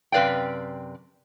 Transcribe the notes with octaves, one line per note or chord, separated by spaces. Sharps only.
F#2 C3 B4 D5 F5 G5